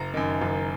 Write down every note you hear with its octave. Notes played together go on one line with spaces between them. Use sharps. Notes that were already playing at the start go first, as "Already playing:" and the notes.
Already playing: F#1 A#5
F#2 D#3
F#1